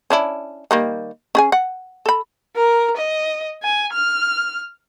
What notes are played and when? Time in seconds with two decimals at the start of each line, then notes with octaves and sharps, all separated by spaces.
0.10 C#4 D4 E4
0.71 D#3 G3 A#3
1.35 C#4 G#4 G#5
1.52 F#5
2.06 A4 B5
2.56 A#4
2.97 D#5
3.63 G#5
3.92 F6